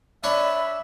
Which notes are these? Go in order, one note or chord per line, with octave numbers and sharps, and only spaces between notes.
D4 C#5 D5 E5 B5